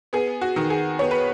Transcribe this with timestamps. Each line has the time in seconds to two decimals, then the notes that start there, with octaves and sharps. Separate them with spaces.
0.13 B3 G#4
0.41 F#4
0.56 D#3
0.70 G#4
0.99 B3 C#5
1.11 B4